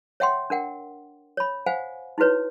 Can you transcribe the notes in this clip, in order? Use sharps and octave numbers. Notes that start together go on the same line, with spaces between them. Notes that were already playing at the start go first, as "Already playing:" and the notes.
C#5 E5 F#5 G5 C6
D4 A#4 F#5 G5
C#5 B5
C5 F5 F#5 G#5
D#4 E4 F#4 B4 C#5